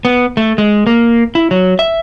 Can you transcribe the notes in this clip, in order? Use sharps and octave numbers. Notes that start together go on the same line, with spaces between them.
B3
A3
G#3
A#3
E4
F#3
E5